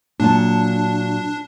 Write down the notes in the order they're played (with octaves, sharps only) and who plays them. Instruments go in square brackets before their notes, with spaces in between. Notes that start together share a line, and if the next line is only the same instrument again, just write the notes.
[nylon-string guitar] A#2 F#3 A5 [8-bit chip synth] D4